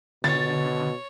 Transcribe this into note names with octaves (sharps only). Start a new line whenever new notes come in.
B2 D3 C#5 A6